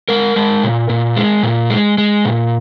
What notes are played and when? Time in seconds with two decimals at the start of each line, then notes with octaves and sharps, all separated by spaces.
0.09 G#3 A#4
0.36 G#3
0.63 A#2
0.90 A#2
1.17 G#3
1.43 A#2
1.70 G#3
1.98 G#3
2.25 A#2